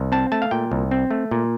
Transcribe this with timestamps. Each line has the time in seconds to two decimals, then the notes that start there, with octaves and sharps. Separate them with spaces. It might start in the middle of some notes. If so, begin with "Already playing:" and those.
Already playing: C2
0.12 C4 A5
0.32 A3 A5
0.42 F5
0.51 A#2 G5
0.72 C2
0.91 C4
1.11 A3
1.31 A#2